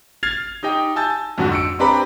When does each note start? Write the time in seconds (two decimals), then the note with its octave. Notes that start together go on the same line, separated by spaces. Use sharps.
0.23 F6 G#6 A6 C7 F7
0.63 D#4 G4 D#5 G5
0.96 G#5 A5 E6 G6 A6
1.38 F2 G#2 D3 F#3 F#4
1.52 E6 C#7 D7
1.79 C4 D4 G4 B4 A#5 B5